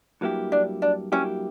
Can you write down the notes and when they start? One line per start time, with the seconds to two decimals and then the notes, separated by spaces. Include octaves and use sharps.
0.21 G2 F#3 A#3 E4 G4
0.52 D4
0.82 D4
1.12 G2 F#3 A#3 C#4 E4 G4